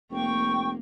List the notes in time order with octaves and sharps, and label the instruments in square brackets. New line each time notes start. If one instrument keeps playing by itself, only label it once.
[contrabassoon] F1 [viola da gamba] A#3 [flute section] G5 C#6